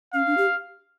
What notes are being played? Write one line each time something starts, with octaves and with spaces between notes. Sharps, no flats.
C#4 F5
D4
G4